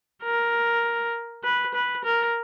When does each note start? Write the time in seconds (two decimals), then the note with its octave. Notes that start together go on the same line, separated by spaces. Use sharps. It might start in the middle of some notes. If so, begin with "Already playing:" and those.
0.23 A#4
1.44 B4
1.74 B4
2.05 A#4